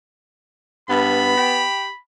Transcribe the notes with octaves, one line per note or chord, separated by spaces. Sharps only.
G2 B3 B5
G4